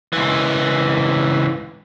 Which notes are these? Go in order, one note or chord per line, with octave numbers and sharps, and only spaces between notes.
C#2 E3